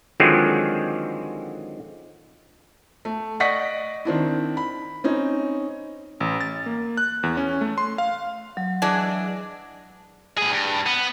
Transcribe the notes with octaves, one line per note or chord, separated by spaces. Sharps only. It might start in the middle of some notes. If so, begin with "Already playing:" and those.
D3 D#3 F3 F#3 G#3 C4
A3
D5 D#5 F#5 C#6 A#6 B6
D#3 C4 D4 E4
B5
C4 C#4 D#4
A1
A6
A#3
F#6
E2
C#4
A3
C6
F5
F#3
E3 G#3 D4
A2 G#4
G2
B3